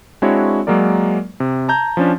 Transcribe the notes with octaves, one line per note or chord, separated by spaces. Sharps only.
G#3 C4 D4 E4 F#4 C#5
F#3 G#3 A#3 A#4 D5
C3
A5 A#5 G6
F3 C#4 D4